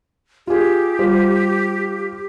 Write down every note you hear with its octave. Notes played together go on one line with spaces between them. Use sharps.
F4 G4 G#4
G3 F4 C5